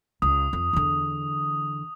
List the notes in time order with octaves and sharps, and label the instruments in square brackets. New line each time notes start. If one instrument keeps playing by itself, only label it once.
[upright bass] C#2 [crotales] D#6
[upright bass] F2
E2 D3